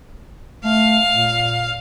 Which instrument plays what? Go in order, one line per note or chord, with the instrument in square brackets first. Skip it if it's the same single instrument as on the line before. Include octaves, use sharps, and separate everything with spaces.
[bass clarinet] A3 [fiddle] F5
[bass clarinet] A#2